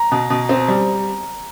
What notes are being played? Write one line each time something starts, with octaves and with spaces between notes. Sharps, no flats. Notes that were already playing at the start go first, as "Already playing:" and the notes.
Already playing: A#5
B2
B2
C4
G3